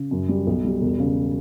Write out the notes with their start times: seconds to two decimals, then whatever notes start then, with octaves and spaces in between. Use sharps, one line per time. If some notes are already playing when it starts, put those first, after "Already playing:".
Already playing: C#3
0.11 F#2
0.29 G3
0.47 B1
0.65 G3
0.81 E1
1.00 C#3